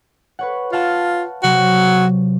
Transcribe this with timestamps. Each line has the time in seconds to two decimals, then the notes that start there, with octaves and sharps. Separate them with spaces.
0.39 B4 C#5 F#5
0.73 F4 F5 F#5 A5
1.43 C3 F#3 F#4